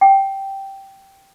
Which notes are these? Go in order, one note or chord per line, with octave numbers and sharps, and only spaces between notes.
G5